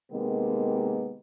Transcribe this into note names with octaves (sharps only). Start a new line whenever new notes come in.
C3 D#3 G#3 A#3 B3